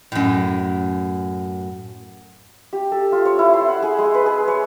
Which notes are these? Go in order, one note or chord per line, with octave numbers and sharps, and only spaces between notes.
F#2 A2
G4
A4
F4
C#5
E4
C6
F#5
G#4
G#3
B4
G#4
C#5